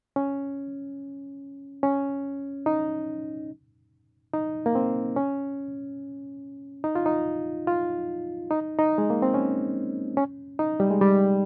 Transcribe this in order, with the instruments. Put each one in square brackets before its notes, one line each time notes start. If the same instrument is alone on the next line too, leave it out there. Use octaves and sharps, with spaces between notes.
[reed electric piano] C#4
C#4
D#4
D#4
A#3
C4
C#4
D#4
F4
D#4
F4
D#4
D#4
G#3
A#3
C4
C#4
C#4
D#4
G3
G#3
G3